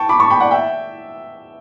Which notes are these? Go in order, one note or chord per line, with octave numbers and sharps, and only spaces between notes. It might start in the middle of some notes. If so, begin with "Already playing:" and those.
Already playing: G5 A5 C#6
B5 D6
A5 C#6
G5 B5
D5 F#5
E5 G5